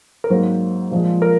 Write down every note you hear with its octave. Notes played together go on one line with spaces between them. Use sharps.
A#4
G#2 F#3 A#3 C5
A#2 F3 G#3
A#4